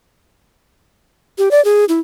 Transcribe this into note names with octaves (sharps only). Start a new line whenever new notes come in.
G4
D5
G#4
E4